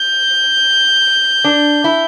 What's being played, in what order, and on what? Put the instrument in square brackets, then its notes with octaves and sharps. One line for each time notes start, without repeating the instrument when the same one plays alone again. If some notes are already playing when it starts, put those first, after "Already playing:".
Already playing: [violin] G6
[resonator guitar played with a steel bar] D4
E4